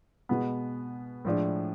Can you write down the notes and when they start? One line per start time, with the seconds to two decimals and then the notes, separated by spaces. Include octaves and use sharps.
0.29 B2 G#3 B3
1.25 A2 F3 G#3 D4